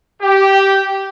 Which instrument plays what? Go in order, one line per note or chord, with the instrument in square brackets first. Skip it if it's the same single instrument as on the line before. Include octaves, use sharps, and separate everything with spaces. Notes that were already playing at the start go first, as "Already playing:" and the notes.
[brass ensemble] G4